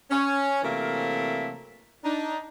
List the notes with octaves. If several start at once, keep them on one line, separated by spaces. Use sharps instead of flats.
C#4
C3 E3 F#3 A3 A#3 A#4
D4 D#4